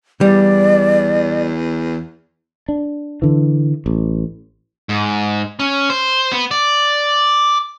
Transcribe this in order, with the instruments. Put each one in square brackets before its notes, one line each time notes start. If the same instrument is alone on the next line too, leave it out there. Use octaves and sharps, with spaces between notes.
[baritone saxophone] E2 [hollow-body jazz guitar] G3 [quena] D5
[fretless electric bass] D4
D3 E3
A1
[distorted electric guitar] G#2
C#4
C5
B3
D5